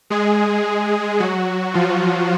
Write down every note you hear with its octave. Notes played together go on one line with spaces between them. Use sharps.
G#3 G#4
F#3 F#4
F3 F4